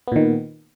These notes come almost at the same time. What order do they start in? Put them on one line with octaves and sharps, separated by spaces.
B3 A#2 D#3